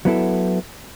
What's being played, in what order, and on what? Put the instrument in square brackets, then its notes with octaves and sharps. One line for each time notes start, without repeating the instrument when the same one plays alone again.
[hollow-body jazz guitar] F#3 B3 E4 A4